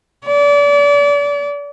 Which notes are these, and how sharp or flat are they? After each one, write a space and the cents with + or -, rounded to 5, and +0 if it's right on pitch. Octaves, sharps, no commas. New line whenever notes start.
D5 -35